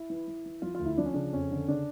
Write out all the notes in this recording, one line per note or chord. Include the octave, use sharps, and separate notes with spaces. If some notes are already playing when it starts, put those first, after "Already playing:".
Already playing: E4
E3
E3
E3
F3 F4
D2 F4
E4
F3 D4
C#4
C#3 D4
F2 C#4
D3
C#3 D4